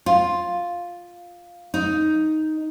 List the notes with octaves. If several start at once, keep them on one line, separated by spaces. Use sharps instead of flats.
F4
D#4